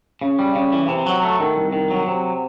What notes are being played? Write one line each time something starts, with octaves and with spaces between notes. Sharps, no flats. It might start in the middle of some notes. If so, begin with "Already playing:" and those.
C#3
G3
C#3
E3
C3
F#3
A3
D#3
C2
D#3
F#3
C3